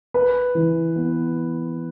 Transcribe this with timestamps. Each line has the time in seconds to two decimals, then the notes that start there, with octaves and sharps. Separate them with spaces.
0.14 B4
0.55 E3
0.96 B3